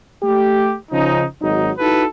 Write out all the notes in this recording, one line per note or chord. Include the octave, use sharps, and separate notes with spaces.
A3 G4
C#3 F3 C#4 D#4
G#1 F#3 D#4
D#4 E4 F#4 A4 B4